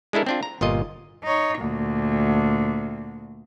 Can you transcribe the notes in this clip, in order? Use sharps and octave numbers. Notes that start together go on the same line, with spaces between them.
G#3 D4 E4 A4 A#4
C4 D4 F4
A#5
G1 A#2 F4 D#5
D#4 C#5
D2 A#2